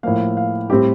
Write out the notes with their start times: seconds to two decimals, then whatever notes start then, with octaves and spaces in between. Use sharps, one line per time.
0.03 A2 F3 A#3 F5
0.37 F5
0.70 A2 G3 C4 G4